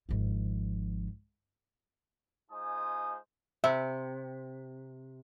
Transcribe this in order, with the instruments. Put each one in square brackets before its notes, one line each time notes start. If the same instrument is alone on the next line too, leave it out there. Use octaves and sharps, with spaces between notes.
[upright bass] G#1 F3
[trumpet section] G#3 D#4 F4 C5 G#5 D#6
[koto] C3 [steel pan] E5